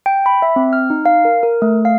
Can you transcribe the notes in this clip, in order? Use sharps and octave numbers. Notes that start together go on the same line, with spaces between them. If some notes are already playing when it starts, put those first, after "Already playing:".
G5
B5
E5
C4
F6
D#4
F5
A#4
A#4
A3
F5